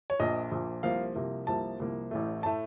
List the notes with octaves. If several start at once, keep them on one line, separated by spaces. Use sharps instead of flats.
C#5
A#1 A#2 F3 D#5
A#1 A#2 F3
C2 C3 F3 A#3 F5
C2 C3 F3 A#3
C2 C3 F3 A#3 A5
C2 C3 F3 A#3
A1 A2 A3
A2 A3 A5